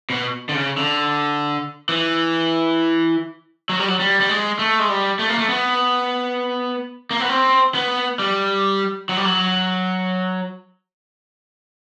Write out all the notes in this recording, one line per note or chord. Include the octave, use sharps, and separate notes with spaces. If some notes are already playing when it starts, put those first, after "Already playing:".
B2
D3
C#3
D3
E3
F#3
G3
F#3
G3
G3
G#3
A3
G#3
G3
A3
A#3
A3
B3
A#3
B3
C4
B3
G3
F#3
G3
F#3